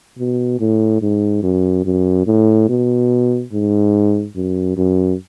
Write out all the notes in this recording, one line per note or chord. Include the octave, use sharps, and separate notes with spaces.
B2
A2
G#2
F#2
F#2
A2
B2
G#2
F#2
F#2